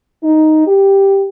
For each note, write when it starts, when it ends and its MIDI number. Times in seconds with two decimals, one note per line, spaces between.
0.24 0.65 63
0.67 1.29 67